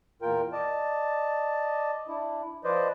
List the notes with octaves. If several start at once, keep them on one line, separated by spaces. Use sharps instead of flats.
E2 A#2 F4 A#4 G5
D5 D#5 A5
D4 E4
F3 B4 C5 D5 D#5